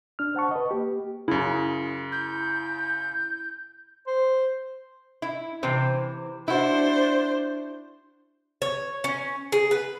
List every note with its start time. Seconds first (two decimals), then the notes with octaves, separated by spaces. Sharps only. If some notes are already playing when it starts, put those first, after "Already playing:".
0.19 D4 F6
0.35 C5 F#5 A5 C#6
0.51 B4 D#5
0.71 A#3 G4
1.28 F#2 C#3 E4
2.12 G6
4.07 C5
5.22 E4
5.63 C3 E3 C4
6.48 D4 E4 F#4 C5
8.62 C#5
9.04 C#4
9.52 G#4
9.71 B4